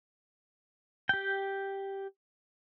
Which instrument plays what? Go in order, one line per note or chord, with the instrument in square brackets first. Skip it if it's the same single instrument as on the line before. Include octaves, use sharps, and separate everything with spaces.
[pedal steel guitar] G4 G5